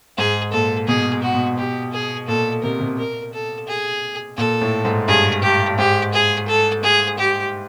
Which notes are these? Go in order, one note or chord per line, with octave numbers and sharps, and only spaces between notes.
G#2 G#4
A#2 A4
B2 G#4
F#4
B2
G4
G#4
A#2 A4
C3 A#4
C3
A#4
A4
G#4
A#2 A4
A2
G#2
G2 G#4
G4
G#2 G4
G#4
A4
G#4
G4